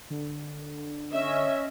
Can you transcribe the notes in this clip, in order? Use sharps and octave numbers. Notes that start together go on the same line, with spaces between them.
D3
C#4 D#5 E5